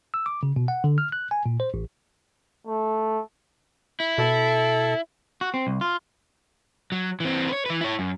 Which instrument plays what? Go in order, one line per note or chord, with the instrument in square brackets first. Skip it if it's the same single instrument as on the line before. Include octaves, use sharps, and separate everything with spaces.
[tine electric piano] E6
D6
C#3
B2
F#5
D3
F6
F#6
G#5
A#2
C5
A1
[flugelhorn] A3
[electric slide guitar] E4
[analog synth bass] B2 [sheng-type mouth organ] A4
[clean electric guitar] F#4
C4
C2
F4
[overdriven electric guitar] F#3
E3 C4
B4 C#5
E3 B4
E4 C#5
F#2